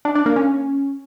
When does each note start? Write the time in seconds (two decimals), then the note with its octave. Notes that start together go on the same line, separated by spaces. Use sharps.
0.05 D4
0.15 D4
0.26 A#3
0.36 C#4